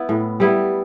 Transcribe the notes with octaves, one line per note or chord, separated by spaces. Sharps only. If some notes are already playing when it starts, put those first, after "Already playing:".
Already playing: B3 E4
A2
G3 B3 E4